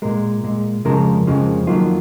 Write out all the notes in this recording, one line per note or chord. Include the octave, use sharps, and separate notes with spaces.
A#2 G#3 A#4
A#2 G#3
F2 C#3 F3 G#3 A#4
F2 C#3 F3 G#3
F2 D#3 F#3 A#3 F4